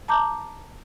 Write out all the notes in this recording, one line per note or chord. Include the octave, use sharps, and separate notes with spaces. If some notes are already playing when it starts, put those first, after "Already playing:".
A5 A#5 D6 G6